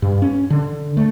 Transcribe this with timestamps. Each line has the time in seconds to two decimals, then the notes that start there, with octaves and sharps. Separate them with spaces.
0.02 G2
0.22 C#4
0.50 D3
0.97 A3